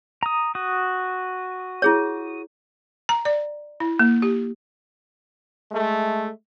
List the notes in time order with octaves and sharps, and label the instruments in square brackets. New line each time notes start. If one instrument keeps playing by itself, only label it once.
[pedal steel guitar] A#5 D#6
F#4 D#6
[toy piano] E4 G#4 C#5
[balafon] A#5
D5
E4
A#3
G4
[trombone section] G#3 A3